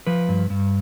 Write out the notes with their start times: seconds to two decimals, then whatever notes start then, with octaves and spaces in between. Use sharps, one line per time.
0.07 F3 B4
0.29 G2
0.50 G2